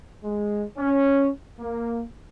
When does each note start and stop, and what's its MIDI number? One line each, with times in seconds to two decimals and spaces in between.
0.24 0.63 56
0.78 1.29 61
1.60 2.02 58